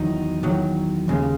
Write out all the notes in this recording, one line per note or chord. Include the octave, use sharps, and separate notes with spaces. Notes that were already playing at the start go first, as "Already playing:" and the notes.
Already playing: E2 D#3 F#3 D#4
E2 D#3 F#3
D#2 C#3 G#3